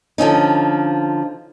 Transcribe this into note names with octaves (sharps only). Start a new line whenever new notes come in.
D3 F3 C#4 D#4